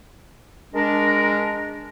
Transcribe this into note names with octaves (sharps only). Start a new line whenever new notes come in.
G#3 D4 A#4